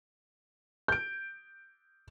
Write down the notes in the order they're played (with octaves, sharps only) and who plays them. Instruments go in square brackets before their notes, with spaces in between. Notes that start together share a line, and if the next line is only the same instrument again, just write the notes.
[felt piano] G6 D7